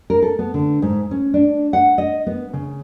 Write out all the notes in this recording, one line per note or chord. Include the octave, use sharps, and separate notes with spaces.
A#4
A4
B3
D3
G#2
C#4
D4
F#5
D#5
B3
C#3